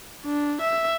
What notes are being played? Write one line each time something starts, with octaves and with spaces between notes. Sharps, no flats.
D4
E5